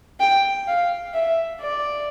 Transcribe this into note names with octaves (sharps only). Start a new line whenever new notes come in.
G5
F5
E5
D5